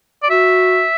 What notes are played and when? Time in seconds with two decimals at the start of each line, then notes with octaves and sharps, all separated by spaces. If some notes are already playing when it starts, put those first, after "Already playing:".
0.23 D5
0.30 F#4 E5